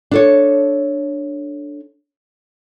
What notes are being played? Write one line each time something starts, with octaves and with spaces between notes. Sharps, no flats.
D4 A4 C#5